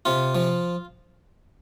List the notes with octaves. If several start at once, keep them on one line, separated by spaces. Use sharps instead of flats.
C3 F4
F3